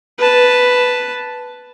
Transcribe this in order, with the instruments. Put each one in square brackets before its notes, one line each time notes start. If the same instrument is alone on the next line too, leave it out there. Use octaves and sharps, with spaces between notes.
[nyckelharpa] B4 A5